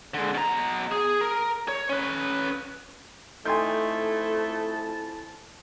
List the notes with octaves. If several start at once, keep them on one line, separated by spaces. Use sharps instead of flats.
D3 G#3
B2 A#5
G#4
A#4
C#5
C#4 B4
F2 A3 D#4 E4 G#5 A5 C6 G6